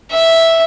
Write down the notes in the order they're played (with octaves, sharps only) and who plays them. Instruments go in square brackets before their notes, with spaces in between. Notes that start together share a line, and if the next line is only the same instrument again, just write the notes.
[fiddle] E5